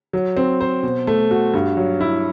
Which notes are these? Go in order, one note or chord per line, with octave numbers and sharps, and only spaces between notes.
F#3
C4
C5
B2
A3
F#4
G2
F#3
E4